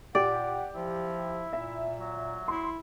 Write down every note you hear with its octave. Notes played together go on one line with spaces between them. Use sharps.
A#2 G4 D5 F#5
F3 E4
A#2 E5
F#3
E4 C6